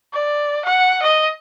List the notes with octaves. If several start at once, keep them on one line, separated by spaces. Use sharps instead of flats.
D5
F#5
D#5